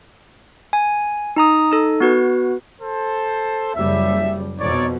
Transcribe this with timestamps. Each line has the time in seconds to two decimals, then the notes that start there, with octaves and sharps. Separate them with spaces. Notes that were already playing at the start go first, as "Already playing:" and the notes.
0.73 G#5
1.36 D#4 A#5 D#6
1.71 D#4 A4
2.00 B3 F#4 B4
2.79 A4 C5
3.74 F#1 G3 E5
4.59 F2 B2 D#4 C#5 D5